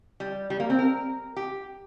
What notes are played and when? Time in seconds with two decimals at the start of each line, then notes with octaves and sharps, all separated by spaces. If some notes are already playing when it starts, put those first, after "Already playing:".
0.20 G3
0.50 G3
0.60 A#3
0.70 C4
0.79 A#4
1.36 G4